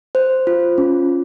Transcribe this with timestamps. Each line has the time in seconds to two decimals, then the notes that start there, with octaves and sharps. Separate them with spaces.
0.15 C5
0.47 F4
0.78 C#4